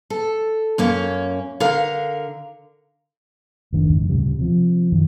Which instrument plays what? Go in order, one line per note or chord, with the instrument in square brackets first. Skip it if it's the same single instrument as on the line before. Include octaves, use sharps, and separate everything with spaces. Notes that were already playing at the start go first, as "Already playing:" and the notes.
[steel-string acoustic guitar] A4
F#2 A#3 C#4
D3 A#4 F5
[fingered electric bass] F#1 D#3 C4 D4
F2 G#2 C#3
D2 A#2 C#3 G3
C3 F3
F#2 D#3